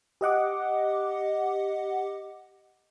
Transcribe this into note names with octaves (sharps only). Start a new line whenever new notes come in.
G4 D#5 F#5 D6